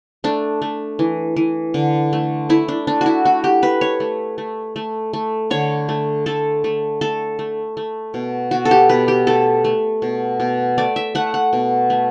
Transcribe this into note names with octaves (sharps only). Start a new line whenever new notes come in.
A3 D4
A3
E3
E3
D3
A3
A3 E4
D4
A3 D4
E4 F#4
A3 F#4
G4
A3 B4
C#5
A3
A3
A3
A3
D3 C#5
A3
A3 A4
A3
A3 A4
A3
A3
B2
B2 F#4
A4
G4
B2 B4
G4
A3 A4
A3
B2
B2
A3 D5
E5
A3 F#5
F#5
B2
A3